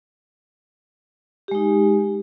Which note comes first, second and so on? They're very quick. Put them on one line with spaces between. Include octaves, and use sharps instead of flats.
G4 G#3 D#4